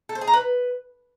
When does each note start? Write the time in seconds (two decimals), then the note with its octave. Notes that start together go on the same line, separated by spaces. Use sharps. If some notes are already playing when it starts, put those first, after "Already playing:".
0.09 A4
0.15 C5
0.21 G#4
0.27 A#5
0.33 B4